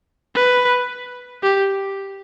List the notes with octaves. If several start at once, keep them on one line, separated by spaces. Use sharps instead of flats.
B4
G4